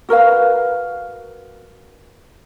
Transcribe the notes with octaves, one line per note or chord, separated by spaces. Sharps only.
F#4 A#4 B4 F5